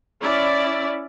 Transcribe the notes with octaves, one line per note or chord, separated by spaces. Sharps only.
C#4 E4 D5